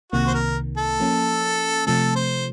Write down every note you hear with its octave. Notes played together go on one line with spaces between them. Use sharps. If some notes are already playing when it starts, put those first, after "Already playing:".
C2 C3 D#3 A#3 F#4
C5
A#4
A4
F3 A#3 C#4
C3 F3 A3 A4
C5